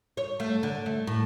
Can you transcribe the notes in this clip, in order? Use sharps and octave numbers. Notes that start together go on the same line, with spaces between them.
C#5
A3
D3
A3
A2